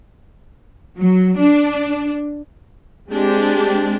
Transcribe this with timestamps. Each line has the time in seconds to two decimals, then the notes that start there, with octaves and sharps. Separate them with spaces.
0.97 F#3
1.37 D4
3.12 G#3 C4 D4 G4